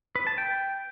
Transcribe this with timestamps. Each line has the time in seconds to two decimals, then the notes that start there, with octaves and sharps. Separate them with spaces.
0.15 B4
0.27 A5
0.38 G5